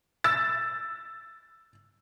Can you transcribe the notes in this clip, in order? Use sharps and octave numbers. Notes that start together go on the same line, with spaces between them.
E6 A6